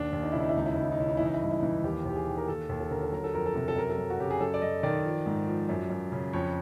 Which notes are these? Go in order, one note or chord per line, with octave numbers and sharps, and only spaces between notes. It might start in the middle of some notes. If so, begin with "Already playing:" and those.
Already playing: D#2 D4
D#2
D#4
C#3 E4
D#4
E4
C#2 D#4
E4
C#2 D#4
E4
D#4
C#3 E4
D#4
E3 E4
D#4
E4
G2 D#4
E4
E3 D#4
D#2 G4
D#2 G4
G#4
D#3
A#4
D#2 A4
D#2
A4
D3 A#4
A4
F#3 A#4
A4
F2 A#4
A4
C3 A#4
A4
F#2 A#4
A4
F#2
F#4
C#3 G4
G#4
F#2 A4
D5
F#2 D#5
D#3 D5
F3
G#2
F3
F#2
F#2
C#3
F2 C#5